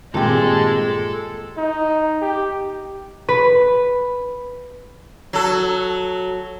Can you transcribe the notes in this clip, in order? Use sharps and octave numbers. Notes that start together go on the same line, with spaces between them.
G2 A#2 D#3 G#3 C4 G4 A4
D#4
G4
B4
F#3 A4